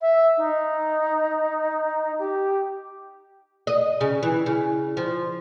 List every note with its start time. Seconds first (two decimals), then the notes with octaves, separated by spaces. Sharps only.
0.01 E5
0.37 D#4
2.19 G4
3.67 D#5
4.01 C#3
4.23 E3
4.46 C#3
4.97 F3